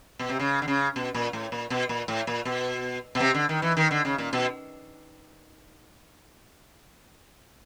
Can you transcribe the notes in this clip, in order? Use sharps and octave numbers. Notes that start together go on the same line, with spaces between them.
B2
C3
C#3
D3
C#3
B2
A#2
A2
A#2
B2
A#2
A2
A#2
B2
B2
C3
D3
D#3
E3
D#3
D3
C#3
A#2
B2